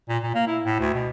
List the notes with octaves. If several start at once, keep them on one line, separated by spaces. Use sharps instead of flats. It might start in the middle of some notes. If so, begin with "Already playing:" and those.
A#2
A#2
A#3
E4
A2
D2
B2